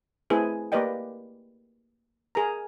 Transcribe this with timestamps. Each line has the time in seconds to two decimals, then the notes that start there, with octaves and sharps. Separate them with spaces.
0.30 A3 C4 E4 G#4 B4
0.72 A#3 G4 B4 D5 D#5 G5
2.35 G#4 A#4 A#5